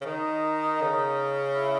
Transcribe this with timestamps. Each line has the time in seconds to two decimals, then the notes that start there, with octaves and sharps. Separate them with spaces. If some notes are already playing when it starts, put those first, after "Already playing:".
0.01 C#3
0.05 D#3 D#4
0.81 C#3
1.55 E4